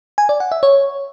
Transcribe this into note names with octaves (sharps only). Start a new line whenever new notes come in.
G#5
D5
F#5
E5
C#5